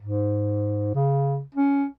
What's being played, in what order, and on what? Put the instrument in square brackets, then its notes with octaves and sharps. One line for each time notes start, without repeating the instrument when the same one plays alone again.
[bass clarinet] G#2
C#3
C#4